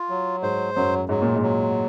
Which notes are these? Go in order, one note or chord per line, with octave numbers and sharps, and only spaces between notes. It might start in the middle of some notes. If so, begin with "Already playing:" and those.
Already playing: F4
F#3
G#2 C5
F#2 F#3
G#2 F#3
A#2
G#2
F#3